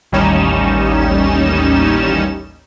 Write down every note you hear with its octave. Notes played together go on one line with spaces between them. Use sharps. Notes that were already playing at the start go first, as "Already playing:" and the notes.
A1 D#2 G3 C#4 D#4 E7